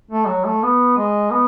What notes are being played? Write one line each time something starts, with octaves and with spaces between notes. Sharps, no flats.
A3
F#3
A3
B3
G#3
B3